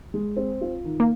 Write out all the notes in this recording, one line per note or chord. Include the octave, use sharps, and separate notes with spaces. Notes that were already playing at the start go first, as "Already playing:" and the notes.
G#3
C4
F4
D#3
A#3